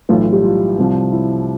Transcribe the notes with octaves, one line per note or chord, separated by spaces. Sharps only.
B1 A2 E3 F4
F4
G3 G4
F4
C2 C3 F3
E4